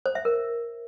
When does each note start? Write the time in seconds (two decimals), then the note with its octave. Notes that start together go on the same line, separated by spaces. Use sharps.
0.06 C5
0.15 E5
0.25 A#4